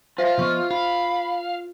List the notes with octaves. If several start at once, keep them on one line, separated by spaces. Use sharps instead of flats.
F4 C5 E5 F5
F3 B3 D#5 C#6 F6
F4 F5 B5